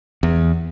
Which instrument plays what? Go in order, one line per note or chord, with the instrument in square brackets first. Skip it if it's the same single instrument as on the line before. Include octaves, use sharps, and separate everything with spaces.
[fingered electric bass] E2